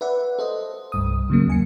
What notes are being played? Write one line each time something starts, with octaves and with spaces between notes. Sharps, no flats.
B4 D5 E5 F#5
A4 C5 D#5
C2 G2 D#6
C#3 F#3 A#3
D#2 G#5 C#7